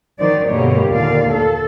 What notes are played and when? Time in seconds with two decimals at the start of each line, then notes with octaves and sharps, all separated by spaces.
0.20 D#3 F#3 D#4 C5 D5
0.50 G2 B2 D3 A#3 G4 C#5
0.89 D#2 A#2 D3 A#3 D5 F5
1.31 A4